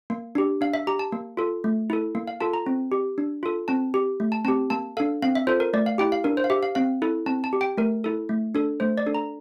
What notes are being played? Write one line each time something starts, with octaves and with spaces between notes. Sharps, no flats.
A#3
D4 G4
D4 F5
E5
G4 A#5
A5
A#3
F4 A4
A3
E4 A4
A#3
F5
F4 A4 A5
A#5
C4
G4
D4
F4 A4
C4 A5
G4
A3
A5
C4 G4 A5
A#3 A5
D4 A4 F5
C4 F5
E5
F4 A4 C5
A#4
A3 D5
F5
E4 G4 G5
F5
D4 A#4
C5
F5
G4 E5
F5
C4 F5
E4 A4
C4 A5
A5
G4
G5
A3 A#4
E4 A4
A3
D4 A4
A3 C5
D5
D4 A4
A#5